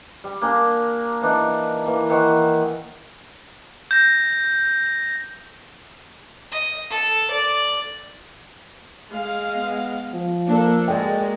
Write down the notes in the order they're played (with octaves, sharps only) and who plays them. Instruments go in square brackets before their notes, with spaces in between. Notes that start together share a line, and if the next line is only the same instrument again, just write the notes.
[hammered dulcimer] G3
A#3 D4 G#5 A#5
E3 D4 D#4
E3 A#3
D#3 E3 F#5
[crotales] G6 A#6
[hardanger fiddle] D#5
A4
D5
[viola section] G#3 F5
[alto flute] B3
[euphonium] F3
[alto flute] A#3 [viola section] D4 A4
[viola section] G#3 A#3 F#4 [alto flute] D5 [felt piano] G5